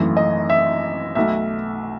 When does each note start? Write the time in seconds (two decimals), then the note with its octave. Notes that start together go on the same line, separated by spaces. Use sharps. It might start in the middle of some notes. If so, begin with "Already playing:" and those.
Already playing: G#1 F#2 E3 A3
0.17 D#5
0.50 E5
1.15 B1 B2 A3 E5